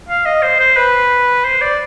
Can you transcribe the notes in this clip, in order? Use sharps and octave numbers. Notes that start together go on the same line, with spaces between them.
F5
D#5
C5
C5
B4
C5
D5